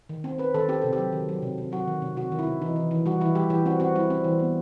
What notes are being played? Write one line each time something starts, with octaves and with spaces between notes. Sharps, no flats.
D#3
C4
C4 B4
D#3 A4
C4 G4
C3 A4
G4
F#3
D#3
F#3
C3
C3
F#3 F#4
D#3
C3
C3 F#4
D#3
E4
C3
E3 D#4
E3
E3
G3 F#4
E3 E4
G3 G4
E3 G4
C4 F#4
C4 F#4
G3 E4
C4
E3
B3